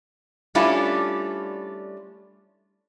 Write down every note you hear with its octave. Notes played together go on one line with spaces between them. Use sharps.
G3 A3 C#4 D4 E4 F4